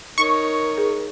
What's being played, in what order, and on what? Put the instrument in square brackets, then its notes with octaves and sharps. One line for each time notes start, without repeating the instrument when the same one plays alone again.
[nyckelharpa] D#4 C#5 [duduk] A#4 [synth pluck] C#6
[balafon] G#4